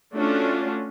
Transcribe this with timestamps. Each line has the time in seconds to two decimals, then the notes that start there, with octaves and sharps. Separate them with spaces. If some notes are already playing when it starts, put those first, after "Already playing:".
0.14 A3 C#4 D4 F4 F#4